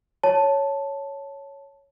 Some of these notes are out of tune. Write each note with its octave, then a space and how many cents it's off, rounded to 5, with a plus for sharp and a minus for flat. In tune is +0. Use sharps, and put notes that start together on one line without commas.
C#5 +0 A5 +0